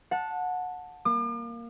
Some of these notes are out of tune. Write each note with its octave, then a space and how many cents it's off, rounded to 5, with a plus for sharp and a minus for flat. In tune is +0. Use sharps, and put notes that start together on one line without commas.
F#5 -20 A5 +0
A#3 +0 D6 +45